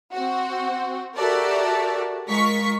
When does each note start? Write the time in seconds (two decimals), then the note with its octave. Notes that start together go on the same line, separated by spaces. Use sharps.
0.14 C4 F#4
1.17 F#4 G4 A4 A#4 D5 E5
2.29 G#3 F4 A#4 C#6 B6